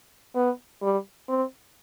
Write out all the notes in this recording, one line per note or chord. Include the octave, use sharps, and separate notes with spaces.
B3
G3
C4